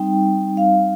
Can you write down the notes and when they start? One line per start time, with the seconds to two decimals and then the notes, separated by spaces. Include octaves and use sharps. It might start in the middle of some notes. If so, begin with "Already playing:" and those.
Already playing: G3 C4 D#4 G5
0.57 F5